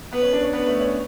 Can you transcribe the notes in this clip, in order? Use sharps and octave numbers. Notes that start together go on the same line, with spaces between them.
B3 B4
C#4
D4
C#4
B3 B4
A3
C#4